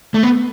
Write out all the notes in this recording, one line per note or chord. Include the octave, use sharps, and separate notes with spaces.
A3
B3